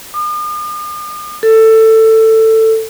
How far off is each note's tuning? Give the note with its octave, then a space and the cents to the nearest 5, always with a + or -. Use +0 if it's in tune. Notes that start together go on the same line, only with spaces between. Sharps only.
D#6 -45
A4 +15